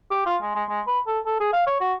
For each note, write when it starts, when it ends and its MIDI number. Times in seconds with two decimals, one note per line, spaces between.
0.11 0.22 67
0.26 0.36 65
0.42 0.54 56
0.55 0.64 56
0.69 0.81 56
0.87 0.99 71
1.07 1.19 69
1.26 1.36 69
1.40 1.52 68
1.53 1.62 77
1.67 1.77 73
1.80 1.94 66